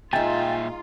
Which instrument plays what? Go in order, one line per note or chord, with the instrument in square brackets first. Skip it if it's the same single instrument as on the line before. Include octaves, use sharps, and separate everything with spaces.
[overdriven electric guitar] A#2 E5 [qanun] G#3 D#4 [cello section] F4 [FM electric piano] G5 G#5 A6